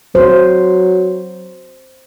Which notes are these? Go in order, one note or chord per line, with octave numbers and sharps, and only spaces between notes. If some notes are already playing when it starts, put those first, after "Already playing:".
F#3 C5